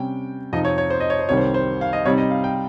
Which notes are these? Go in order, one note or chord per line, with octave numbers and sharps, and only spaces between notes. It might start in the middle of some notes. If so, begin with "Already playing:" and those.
Already playing: C3 G3 C#4 G5
F2 C3 F3 C4 D#4 D#5
C#5
C#5
C5
D#5
C#5
C5
C2 C3 D#3 G3 C#5
C5
C5
F5
D#5
C3 G3 C4 D#4 C#5
D#5
F5
G5